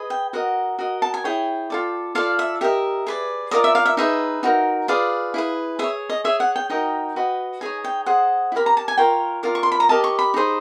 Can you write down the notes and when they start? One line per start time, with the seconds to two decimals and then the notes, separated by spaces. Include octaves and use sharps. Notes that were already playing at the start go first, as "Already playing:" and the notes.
Already playing: G#4 B4 D#5
0.10 G5
0.33 F#4 A#4 D#5 F#5
0.79 F#4 A#4 D#5
1.02 A5
1.14 G#5
1.24 E4 G#4 C#5 G5
1.70 F4 A4 D5
2.15 F4 A4 D5 F5
2.39 E5
2.61 G4 A#4 D#5 E5
3.07 G#4 B4 D5
3.51 F4 A#4 D5 D#5
3.64 E5
3.75 F5
3.86 E5
3.97 D#4 G#4 B4 E5
4.43 D#4 F#4 A#4
4.88 F4 G#4 B4 D5 F5
5.34 E4 G#4 B4
5.79 G#4 C#5 E5
6.10 D#5
6.24 G#4 C#5 E5
6.40 F#5
6.56 G5
6.70 D#4 F#4 A#4 D#5 G5
7.16 F#4 B4 D#5
7.61 D#4 G#4 C#5 G#5
7.84 G5
8.06 G#4 C5 D#5 F#5
8.52 E4
8.55 G4 A#4 B5
8.66 A#5
8.77 A5
8.88 G#5
8.97 F4 A#4 C#5 G5
9.43 F4 A#4 D5
9.55 C#6
9.63 C6
9.72 B5
9.80 A#5
9.89 G4 A#4 D#5 A5
10.04 C#6
10.19 B5
10.34 D#4 G#4 C5